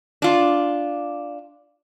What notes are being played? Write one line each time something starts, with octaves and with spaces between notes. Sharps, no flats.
D4 F4